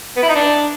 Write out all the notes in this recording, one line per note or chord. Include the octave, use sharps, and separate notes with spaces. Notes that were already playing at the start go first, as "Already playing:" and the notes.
B3
E4
D#4
D4